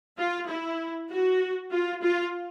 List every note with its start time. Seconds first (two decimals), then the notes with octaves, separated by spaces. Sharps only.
0.18 F4
0.48 E4
1.10 F#4
1.71 F4
2.02 F4